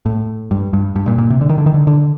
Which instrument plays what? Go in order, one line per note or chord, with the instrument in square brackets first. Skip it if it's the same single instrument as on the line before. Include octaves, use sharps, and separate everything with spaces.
[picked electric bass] A2
G2
G2
G2
A#2
A#2
C3
D3
D#3
D3
D#3
D3
D3